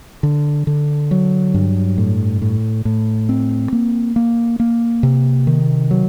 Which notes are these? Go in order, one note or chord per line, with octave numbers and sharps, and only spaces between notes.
D3
D3
F#3
G2
A2
A2
A2
C4
A#3
A#3
A#3
C3
D#3
F#3